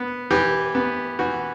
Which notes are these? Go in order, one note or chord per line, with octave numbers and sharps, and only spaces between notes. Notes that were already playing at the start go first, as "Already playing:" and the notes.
Already playing: B3
E3 G4
B3
E3 F#4